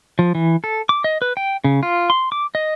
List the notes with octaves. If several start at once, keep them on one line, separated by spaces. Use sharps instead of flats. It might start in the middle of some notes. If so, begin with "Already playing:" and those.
F3
E3
A4
D6
D#5
B4
G5
C#3
F4
C6
D6
D#5